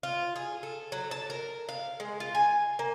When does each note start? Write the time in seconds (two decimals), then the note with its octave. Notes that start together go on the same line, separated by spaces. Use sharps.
0.03 F4
0.36 G#4
0.63 A4
0.92 F#3
1.11 A5
1.30 A#4
1.69 F5
2.00 G#3
2.20 F4
2.35 G#5
2.79 A#3